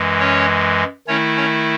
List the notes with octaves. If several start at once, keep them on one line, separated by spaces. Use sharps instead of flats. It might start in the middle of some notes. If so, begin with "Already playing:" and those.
Already playing: F#2 E3 G#3
C#4 C#5
D#3 A3 C#4 E4 C#5
C#4 C#5